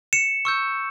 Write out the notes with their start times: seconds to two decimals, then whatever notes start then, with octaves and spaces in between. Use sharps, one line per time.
0.13 C#7 E7
0.45 C#6 E6 G6